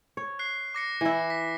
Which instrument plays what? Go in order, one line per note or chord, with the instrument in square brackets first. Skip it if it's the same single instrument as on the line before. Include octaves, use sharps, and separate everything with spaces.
[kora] C#5
[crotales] F#6 C7
D6 A#6 C#7
[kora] E3 E4
[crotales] B6